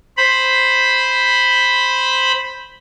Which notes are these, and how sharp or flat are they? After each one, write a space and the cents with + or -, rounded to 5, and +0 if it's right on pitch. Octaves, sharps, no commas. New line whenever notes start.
C5 +0 B5 +0